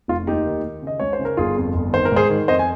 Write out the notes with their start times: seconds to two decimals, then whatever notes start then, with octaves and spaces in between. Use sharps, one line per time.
0.08 F1 F4
0.27 D#2 D#4 G4
0.46 D#3
0.64 D#3
0.82 C#3 D#5
1.00 C#2 C#5
1.13 C5
1.19 C#3
1.25 A#4
1.37 G1 F4 G#4
1.57 F2
1.75 G1
1.93 D#3 C5
2.05 A#4
2.12 G#2 G#4 C5
2.30 D#3
2.48 F2 C5 D#5
2.59 G#5